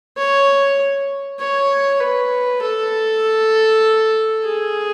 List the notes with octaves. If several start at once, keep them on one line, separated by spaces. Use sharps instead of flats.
C#5
C#5
B4
A4
G#4